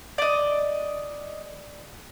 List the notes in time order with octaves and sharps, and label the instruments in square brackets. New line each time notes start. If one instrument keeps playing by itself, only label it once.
[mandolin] D5 D#5